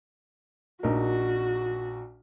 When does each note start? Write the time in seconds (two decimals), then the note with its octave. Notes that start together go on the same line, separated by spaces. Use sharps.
0.83 A#1 D#4 F#4 A#4